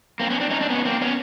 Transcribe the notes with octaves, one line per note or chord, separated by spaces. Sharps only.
A#3 C4
B3 C#4
C4 D4
C#4 D#4
C4 D4
B3 C#4
A#3 C4
B3 C#4